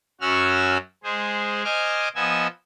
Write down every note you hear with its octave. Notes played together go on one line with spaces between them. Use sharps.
F#2 C#4 F#4 F#5 E6 F6
G#3 G#4 C5
C5 D#5 G#5 D6 F6
F3 B3 D#5 G#5 E6